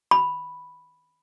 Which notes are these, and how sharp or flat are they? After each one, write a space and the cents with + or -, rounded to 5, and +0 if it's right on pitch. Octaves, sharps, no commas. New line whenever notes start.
B5 +0